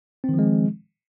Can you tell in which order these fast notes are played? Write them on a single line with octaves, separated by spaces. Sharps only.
C4 D#3 F3 G#3